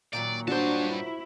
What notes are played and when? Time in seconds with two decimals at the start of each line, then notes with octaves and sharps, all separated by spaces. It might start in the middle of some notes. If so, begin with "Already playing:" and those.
0.13 A#2 D#3 F#3 D5
0.48 G2 D4 F#4 C5 A5
0.92 E4